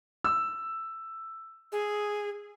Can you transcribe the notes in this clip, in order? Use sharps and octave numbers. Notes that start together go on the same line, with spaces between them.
E6
G#4